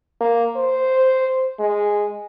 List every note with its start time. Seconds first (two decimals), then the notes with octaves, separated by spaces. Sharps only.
0.21 A#3
0.56 C5
1.60 G#3